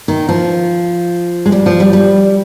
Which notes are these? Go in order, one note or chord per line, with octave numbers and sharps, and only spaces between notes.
D#3
F3
G#3
G3
F3
G3
G3